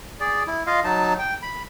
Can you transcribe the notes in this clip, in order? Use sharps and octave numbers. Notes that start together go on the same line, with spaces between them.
G#4 D5
E4
F4 D#5 F5
F#3 D#4 A5
G5
B5